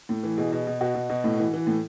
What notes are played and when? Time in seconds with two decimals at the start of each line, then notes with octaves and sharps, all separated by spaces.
0.09 A2
0.23 E3
0.38 B2 G#4
0.52 B2
0.67 B2
0.81 B2 F#4
0.95 B2
1.09 B2
1.24 A2
1.39 E3
1.54 E3
1.67 A2